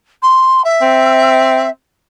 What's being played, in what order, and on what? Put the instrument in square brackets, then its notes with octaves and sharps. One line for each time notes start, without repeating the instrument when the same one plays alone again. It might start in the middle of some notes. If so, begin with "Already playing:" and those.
[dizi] C6
E5
[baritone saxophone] C4